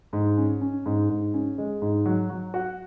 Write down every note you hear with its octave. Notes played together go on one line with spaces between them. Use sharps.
G#2
C#4
C#4
G#2
G#2
C#4
G#3
G#2
F#3
F#3
F#4